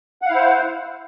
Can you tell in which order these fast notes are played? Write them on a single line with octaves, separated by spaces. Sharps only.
F#5 F5 E4 C5